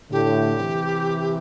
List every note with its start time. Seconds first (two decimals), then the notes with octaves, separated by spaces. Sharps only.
0.10 A2 D3 G4
0.56 C3 E3